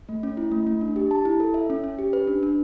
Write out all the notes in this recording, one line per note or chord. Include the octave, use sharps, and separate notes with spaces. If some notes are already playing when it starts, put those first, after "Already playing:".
A3
C#4
E4
A3
A3
D4
G4
A5
E4
A4
E5
C#4
C#4
G4
B4
D4
D4